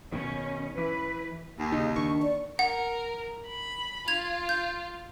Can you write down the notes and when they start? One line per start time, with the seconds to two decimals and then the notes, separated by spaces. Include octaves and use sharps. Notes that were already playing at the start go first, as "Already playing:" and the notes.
0.12 B2 D#3 C#4
0.78 E3 B4
1.59 D#2
1.72 C#3 D#4
1.96 D#3 D4 C#6
2.22 D5
2.59 A#4 F#5
3.48 B5
4.08 F4 G#6 F7
4.49 G6